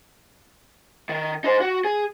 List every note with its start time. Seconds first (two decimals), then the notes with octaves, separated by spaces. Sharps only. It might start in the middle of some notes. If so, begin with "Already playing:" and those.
1.09 D#3
1.44 D#4 C5
1.61 F#4
1.85 G#4